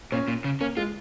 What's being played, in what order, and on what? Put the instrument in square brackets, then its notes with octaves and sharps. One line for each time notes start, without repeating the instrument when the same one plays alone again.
[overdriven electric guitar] A#2 [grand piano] C#4
[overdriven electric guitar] A#2
C#3
[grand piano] A#3 [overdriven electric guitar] C#4
[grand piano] G#3 [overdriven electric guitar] F4